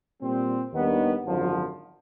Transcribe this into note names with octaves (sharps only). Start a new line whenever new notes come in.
A#2 G3 C4
D#2 D#3 G3 B3 D4
G#1 F#2 D3 F3